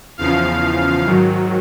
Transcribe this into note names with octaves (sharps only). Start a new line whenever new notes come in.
E2 C#3 F3 F5
G#2 D#3 F#3